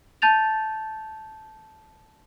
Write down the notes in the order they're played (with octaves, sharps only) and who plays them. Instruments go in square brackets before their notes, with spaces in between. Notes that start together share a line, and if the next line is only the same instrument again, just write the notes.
[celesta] A5 G6 A6 F7